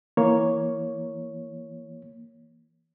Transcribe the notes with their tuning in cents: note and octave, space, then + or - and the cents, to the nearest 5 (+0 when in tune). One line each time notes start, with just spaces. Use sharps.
E3 +0 A#3 +0 C#5 +0